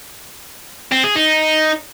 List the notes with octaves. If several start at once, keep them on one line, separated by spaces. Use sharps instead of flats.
C4
G#4
D#4